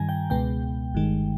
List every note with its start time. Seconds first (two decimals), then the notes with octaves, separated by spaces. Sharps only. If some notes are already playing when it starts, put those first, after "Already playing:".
Already playing: G2 D#3 G3 G#5 A#5
0.09 G5
0.30 C#2 B2 G#3 B3 G5
0.93 G1 G2 D#3 G#3